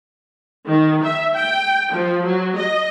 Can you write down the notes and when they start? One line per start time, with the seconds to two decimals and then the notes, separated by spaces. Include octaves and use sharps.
0.67 D#3
1.04 E5
1.35 G5
1.92 F3
2.24 F#3
2.56 D#5